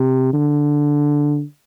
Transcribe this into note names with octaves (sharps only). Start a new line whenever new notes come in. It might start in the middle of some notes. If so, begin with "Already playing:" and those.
Already playing: C3
D3